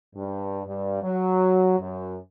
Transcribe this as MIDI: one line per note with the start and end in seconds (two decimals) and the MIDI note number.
0.15 0.61 43
0.67 1.01 43
1.02 1.79 54
1.80 2.16 42